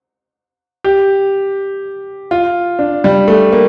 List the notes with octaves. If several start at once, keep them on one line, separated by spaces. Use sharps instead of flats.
G4
F4
D4
G3
A3
A#3